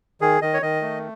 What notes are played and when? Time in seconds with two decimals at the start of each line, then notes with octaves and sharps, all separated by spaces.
0.21 D#3 G#4
0.42 D#3 D#5
0.54 C#5
0.62 D#3 D#5
0.82 A3